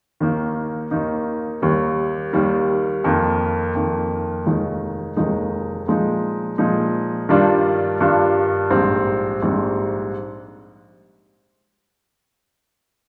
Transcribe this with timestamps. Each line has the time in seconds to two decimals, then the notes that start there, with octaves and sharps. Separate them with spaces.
0.20 D#2 D#3 A#3 D#4
0.91 D#2 D#3 A#3 D#4
1.62 D#2 D#3 G3
2.33 D#2 D#3 G3
3.04 F2 D#3 A#3
3.75 F2 D#3 A#3
4.46 F1 D#2 D#3 G#3 D#4
5.17 F1 D#2 D#3 G#3 D#4
5.87 A#2 F3 G#3 D#4
6.58 A#2 F3 G#3 D#4
7.29 G2 D#3 G3 D4 F4
8.01 G2 D#3 G3 D4 F4
8.70 A#1 G#2 G3 C4
9.42 A#1 G#2 G3 C4